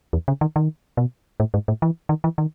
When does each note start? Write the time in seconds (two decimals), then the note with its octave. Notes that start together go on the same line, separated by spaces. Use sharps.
0.13 E2
0.28 C#3
0.41 D#3
0.56 D#3
0.97 B2
1.40 A2
1.54 G#2
1.68 A2
1.82 E3
2.09 D#3
2.24 E3
2.38 D#3